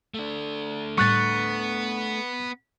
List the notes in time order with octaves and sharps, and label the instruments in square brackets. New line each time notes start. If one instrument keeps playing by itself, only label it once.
[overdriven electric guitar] A3 D4
[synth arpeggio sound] A2 G3 [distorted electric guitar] B3 [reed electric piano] C#6 F#6 A6